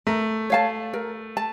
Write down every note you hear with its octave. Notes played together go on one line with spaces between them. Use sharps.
A3 A#4
C#5 F5 A5
A#4
A5